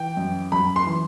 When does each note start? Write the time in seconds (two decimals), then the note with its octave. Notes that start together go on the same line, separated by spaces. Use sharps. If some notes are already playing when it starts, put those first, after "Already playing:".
Already playing: E3 G5
0.17 F#2
0.52 F#2 B5
0.76 C6
0.87 E3